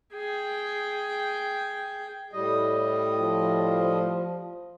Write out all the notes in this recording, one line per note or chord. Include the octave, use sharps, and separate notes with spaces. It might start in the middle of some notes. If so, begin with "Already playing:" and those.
G#4 G5
A2 G3 D#5
F3